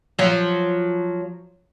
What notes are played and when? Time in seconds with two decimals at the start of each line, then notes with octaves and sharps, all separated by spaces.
0.19 F3 F#3